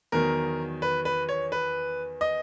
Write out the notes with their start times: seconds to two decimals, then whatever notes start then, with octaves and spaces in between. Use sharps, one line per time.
0.12 E2 D#3 F#3 A#4
0.82 B4
1.05 B4
1.29 C#5
1.52 B4
2.21 D#5